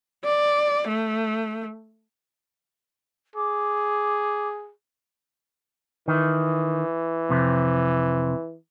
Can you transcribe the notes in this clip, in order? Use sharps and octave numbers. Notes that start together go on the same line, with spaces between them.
D5
A3
G#4 D6
D#3 E3
F2 C3